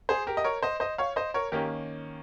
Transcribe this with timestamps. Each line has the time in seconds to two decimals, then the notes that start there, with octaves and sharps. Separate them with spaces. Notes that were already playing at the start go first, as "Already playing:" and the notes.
0.09 G#4 C5
0.27 G4 A#4
0.37 D#5
0.44 A#4 C#5
0.63 C5 D#5
0.80 C5 D#5
0.98 C#5 F5
1.16 C5 D#5
1.34 A#4 C#5
1.52 D#3 A#3 C#4 G4 A#4